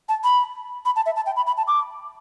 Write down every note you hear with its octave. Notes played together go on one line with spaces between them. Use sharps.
A5
B5
B5
A5
E5
A5
G5
B5
B5
A5
D6